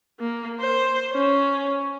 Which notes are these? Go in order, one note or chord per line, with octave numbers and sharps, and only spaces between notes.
A#3
C5
C#4